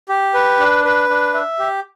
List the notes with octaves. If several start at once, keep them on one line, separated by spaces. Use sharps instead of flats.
G4
B4
D4
B4
D4
E5
G4